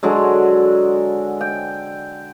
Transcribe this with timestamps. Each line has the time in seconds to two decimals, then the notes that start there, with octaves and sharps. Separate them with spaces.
0.03 D3 F#3 G#3
1.41 G5